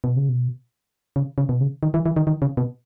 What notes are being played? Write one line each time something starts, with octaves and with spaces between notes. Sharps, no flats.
B2
C#3
B2
C#3
C#3
B2
C#3
D#3
E3
E3
D#3
D#3
C#3
B2